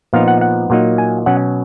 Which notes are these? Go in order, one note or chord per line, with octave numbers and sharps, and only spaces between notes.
A#2 F3 B3 D#4 F5
F#5
F#5
A#2 F#3 A#3 D#4
G#5
B2 F#3 C#4 F#5